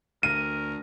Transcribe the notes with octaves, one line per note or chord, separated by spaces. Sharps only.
D2 A#4 D#7